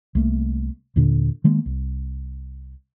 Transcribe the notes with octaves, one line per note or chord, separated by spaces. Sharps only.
C2 A3 A#3
D#2 A#2 D3 D4
D#3 G#3 A#3 B3
C2